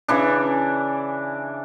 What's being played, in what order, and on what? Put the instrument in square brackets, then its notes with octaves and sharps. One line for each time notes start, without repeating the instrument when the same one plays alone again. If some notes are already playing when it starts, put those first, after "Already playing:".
[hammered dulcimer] C#3 E3 D4